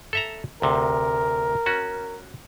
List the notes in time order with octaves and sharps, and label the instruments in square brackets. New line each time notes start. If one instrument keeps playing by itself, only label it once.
[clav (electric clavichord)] A4 E5 A#5
[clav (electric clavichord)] D2 C3 [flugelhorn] A#4
[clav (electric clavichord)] C#4 F#4